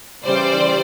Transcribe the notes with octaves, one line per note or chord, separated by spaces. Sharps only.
C#3 E3 G3 C5 D5